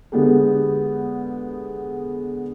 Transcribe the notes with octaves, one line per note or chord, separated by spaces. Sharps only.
D3 G#3 B3 G4 A4